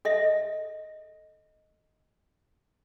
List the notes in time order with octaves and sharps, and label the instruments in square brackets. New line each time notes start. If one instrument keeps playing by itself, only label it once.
[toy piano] A4 D#5 E5